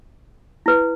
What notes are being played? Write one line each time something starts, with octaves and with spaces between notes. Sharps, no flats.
E4 B4